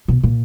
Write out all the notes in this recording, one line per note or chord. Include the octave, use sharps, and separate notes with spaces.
B2
A#2